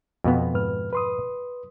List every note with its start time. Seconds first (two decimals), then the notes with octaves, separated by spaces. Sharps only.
0.24 F2 B2 B3
0.54 G#2 B4 F6
0.93 B4 C6 D#6